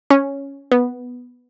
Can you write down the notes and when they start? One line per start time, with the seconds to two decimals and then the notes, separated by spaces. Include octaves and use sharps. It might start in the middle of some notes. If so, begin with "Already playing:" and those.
0.11 C#4
0.72 B3